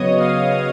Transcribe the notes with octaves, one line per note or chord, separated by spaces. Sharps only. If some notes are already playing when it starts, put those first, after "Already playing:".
Already playing: C#3 F#3 B3 C#5 D#5 C#6 D#6
F5 F6